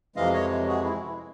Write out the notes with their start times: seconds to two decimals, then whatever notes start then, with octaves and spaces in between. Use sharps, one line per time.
0.16 F2 C3 E3 G#3 D#5 F5
0.33 C#5 D#5
0.68 F#4 G#4
0.84 E4